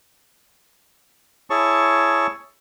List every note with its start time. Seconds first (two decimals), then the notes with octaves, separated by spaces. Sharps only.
1.50 E4 G#4 C#5 A5 C#6